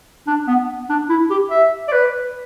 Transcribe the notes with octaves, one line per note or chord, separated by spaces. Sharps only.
D4
B3
D4
E4
G4
E5
D5
B4